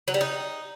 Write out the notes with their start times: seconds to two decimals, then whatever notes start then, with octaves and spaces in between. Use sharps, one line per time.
0.08 F#3
0.14 G3
0.21 D#4